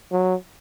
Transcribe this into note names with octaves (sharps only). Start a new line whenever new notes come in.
F#3